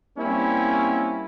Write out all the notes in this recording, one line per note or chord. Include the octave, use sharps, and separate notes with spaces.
G3 A#3 C4 C#4 E4